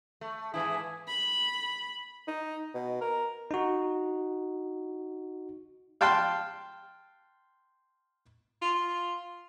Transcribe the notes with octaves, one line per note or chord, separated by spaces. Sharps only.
A3
G#2 E3 E4 G#4
B5
D#4
B2
A#4
D#4 F#4
F5 G5 A5 C6 F6 F#6
F4